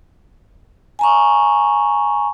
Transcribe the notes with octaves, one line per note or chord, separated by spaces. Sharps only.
G#5 A#5 C#6